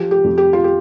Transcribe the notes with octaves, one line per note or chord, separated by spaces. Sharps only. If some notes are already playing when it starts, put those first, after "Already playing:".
Already playing: F3 G4
G4
F2
G4
F4
G4